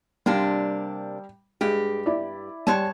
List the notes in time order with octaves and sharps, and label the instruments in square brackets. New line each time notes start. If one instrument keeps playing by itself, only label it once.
[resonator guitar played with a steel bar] C3 A#3 D4 [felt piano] G3
[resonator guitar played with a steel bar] G2 G4 [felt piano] G#3
[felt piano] E4 D5
[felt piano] G3 [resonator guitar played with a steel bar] G#3 C#5 A5